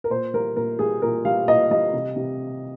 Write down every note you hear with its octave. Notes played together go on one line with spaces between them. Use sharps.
A#4
A#2 C5
G3 A#4
A#2 A#4
G3 G#4
A#2 A#4
G3 F5
A#2 D#5
G3 D#5
C3
C3